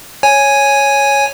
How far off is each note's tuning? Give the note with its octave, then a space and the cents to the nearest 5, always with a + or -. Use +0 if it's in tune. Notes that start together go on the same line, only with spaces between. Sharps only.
C#5 +0 G#5 +0